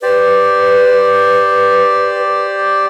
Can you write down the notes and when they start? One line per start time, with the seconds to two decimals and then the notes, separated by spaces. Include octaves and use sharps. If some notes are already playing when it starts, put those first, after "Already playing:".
0.02 G4 B4 C5 D5